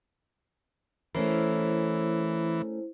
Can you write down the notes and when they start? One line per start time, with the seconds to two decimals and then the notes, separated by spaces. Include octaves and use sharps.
1.15 E3 A3 C#4 E4 A#4 C5